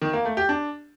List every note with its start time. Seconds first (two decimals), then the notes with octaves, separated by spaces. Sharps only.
0.02 D#3
0.13 A#3
0.25 A3
0.37 G4
0.49 D4